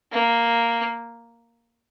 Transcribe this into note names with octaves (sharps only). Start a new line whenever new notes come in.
A#3